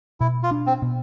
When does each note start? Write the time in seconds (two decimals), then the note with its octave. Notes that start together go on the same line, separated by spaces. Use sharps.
0.20 B2 E4
0.43 F4
0.51 D4
0.66 C4
0.82 B2